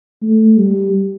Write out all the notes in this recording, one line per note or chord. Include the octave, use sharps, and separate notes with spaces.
A3
G3